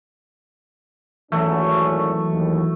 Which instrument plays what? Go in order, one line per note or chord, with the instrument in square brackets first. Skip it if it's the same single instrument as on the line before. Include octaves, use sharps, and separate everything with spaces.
[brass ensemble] G#1 A#2 C#4 [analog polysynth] E3 F#3 [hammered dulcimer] A3
[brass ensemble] D#2